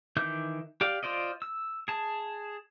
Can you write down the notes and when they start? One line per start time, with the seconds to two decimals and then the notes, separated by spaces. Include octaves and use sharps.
0.17 D#3 E3 E5 D6 G6
0.81 G4 D5 F5
1.03 F4 C5 D5 D#5
1.42 E6
1.88 G#4 A5